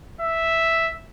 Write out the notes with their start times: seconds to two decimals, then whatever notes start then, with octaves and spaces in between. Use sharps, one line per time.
0.21 E5